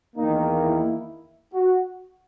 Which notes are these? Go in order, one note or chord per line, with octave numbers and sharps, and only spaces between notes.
E2 D#3 A#3 D#4
E4
F#4